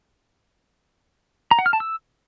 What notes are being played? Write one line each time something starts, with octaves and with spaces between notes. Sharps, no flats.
A#5
F#5
F6
A5
E6